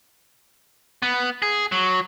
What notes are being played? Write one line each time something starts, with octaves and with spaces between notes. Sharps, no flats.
B3
G#4
F#3